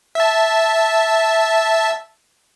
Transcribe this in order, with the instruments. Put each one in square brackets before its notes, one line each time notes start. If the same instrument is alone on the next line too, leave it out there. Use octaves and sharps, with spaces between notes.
[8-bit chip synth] E5 A5